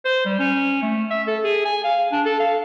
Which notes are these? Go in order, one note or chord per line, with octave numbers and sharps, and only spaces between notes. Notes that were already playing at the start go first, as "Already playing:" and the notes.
C5
G3
C#4
A3
E5
A4
G#4
G#5
F5
D4
A4
F5